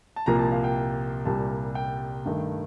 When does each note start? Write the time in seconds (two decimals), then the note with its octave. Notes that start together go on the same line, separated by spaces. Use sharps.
0.16 A5
0.26 C2 A#2 F3 A#3 A#5
0.39 A5
0.52 F5
0.64 G5
1.25 C2 A#2 G3 A#3 A5
1.75 G5
2.25 G2 D#3 A3